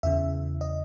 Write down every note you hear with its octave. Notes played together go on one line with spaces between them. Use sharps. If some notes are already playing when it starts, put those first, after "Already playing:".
E2 C#3 E3 E5
D#5